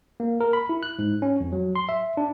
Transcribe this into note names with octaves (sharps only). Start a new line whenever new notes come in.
A#3
A#4
B5
E4
F#6
G#2
C#4
F2
F#3
C6
E5
D4